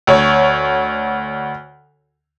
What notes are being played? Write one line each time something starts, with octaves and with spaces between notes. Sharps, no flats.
D2 C#5